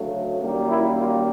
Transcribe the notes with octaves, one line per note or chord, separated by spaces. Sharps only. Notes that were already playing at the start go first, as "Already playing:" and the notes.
Already playing: D2 C#3 F#3 A3
F#2 D#3 G3 A#3
E4
F4